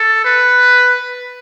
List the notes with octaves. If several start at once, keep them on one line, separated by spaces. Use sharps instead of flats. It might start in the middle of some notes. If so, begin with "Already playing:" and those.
Already playing: A4
B4